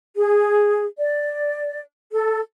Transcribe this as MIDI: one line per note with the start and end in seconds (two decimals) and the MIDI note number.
0.16 0.85 68
0.97 1.81 74
2.12 2.40 69